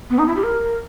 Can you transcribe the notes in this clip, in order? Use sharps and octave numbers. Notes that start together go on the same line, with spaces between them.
B3
D#4
E4
G4
A#4